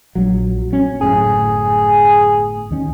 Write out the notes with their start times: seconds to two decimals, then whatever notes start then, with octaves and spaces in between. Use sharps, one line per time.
0.15 A#1 F#3
0.73 C#4
1.01 G1 F#2 A2 G#4
2.71 D#2 D#3 C#4